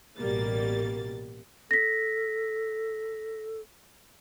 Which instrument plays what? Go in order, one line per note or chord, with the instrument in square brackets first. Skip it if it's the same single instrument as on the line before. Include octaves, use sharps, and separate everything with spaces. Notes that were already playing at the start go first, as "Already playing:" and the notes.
[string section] A1 B2 G3 A#3 A6
[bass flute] A4 [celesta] A#6 B6